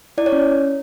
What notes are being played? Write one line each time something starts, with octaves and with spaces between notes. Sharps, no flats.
E4 D5
C#5
C#4